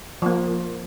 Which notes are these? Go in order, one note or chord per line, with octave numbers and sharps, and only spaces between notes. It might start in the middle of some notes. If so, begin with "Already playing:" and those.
F3 A#3